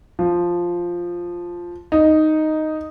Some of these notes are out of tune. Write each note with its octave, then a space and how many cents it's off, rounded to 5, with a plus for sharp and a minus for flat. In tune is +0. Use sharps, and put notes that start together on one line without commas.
F3 +0
D#4 +0